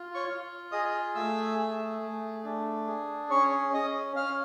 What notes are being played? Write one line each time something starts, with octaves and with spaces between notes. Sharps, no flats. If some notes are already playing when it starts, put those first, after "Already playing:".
Already playing: F4
C#5 C#6
F4
G#4 D#5 D#6
A3 E5 E6
G#4
A3
D4
G#4
C#4 C#5 C#6
C#4 D#5 D#6
C#4 F5 F6